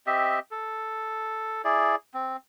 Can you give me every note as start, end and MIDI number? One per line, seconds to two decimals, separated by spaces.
0.07 0.39 60
0.07 0.39 67
0.07 0.39 75
0.07 0.39 76
0.51 1.62 69
1.65 1.95 64
1.65 1.95 68
1.65 1.95 74
2.14 2.37 60